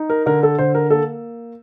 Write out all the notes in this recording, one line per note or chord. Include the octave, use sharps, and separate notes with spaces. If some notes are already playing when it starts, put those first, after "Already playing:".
Already playing: D#4
A#4
D3 A#4
A4
D3 C5
A#4
A#3 A4